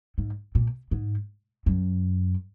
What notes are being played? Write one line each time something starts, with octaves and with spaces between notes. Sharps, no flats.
G#2
A#2
G#2
F#2